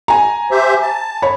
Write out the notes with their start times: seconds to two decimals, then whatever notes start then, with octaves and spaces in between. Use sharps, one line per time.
0.08 G#5 A#5
0.51 G4 C5 E5
0.82 A5
1.22 C#5 B5